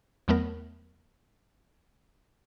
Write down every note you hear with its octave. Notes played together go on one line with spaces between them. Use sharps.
E2 F#3 A3 B3 A#4